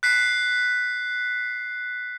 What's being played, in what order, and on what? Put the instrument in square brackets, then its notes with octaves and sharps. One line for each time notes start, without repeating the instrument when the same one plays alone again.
[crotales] F#6 B6 C7